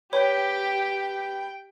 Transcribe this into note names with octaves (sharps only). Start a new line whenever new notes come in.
G4 B4 C#5 G5